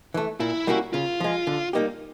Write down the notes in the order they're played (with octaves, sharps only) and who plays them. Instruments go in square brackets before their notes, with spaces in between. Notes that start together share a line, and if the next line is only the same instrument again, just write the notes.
[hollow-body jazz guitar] E3 A3
[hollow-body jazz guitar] A#2 [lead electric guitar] E4
[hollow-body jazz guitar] G3 A#3 C#4 F#4
[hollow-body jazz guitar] C#3 [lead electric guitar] F4
[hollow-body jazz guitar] F3 G#3
D3
G3 A#3 D#4 G4